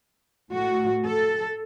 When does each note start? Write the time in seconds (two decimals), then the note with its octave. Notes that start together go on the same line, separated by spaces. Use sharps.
0.52 A2 A3 F#4
1.05 A4